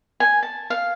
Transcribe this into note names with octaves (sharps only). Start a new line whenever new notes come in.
G#5
A5
F5